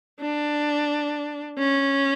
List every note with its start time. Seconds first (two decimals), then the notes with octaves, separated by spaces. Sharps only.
0.21 D4
1.58 C#4